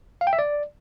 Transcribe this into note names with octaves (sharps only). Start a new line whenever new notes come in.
F5
G5
E5
D5